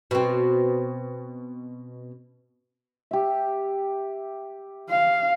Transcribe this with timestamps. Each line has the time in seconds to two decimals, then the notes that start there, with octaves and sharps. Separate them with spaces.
0.11 B2 C4
3.11 G4 E5
4.90 F5